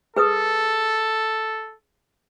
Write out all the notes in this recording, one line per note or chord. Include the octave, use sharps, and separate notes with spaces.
G#4 A4 B4 D#6